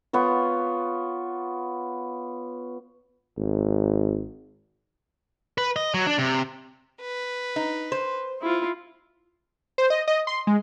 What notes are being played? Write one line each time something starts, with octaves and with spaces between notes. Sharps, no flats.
B3 F4 C#5
G#1
B4
D#5
F#3
D4
C3
B4
D#4
C5
E4 F4
C5
D#5
D#5
C6
G#3